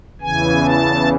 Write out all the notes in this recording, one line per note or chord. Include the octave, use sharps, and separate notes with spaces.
E2 C#3 E3 G#5
A5